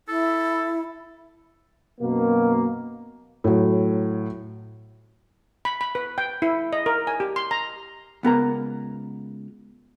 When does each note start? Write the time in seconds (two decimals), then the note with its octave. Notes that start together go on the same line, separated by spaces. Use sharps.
0.08 E4 A4
2.01 F#2 B2 A#3
3.44 A2 F#3
5.65 B5
5.81 B5
5.95 B4
6.18 G5
6.42 E4
6.73 D#5
6.86 A#4
7.07 G#5
7.20 G4
7.36 C6
7.51 A#5
8.23 C#2 B3 A#4 A#5